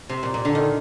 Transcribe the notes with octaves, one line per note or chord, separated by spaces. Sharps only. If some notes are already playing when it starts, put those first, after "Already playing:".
C3
A#2
A#2
D3
D#3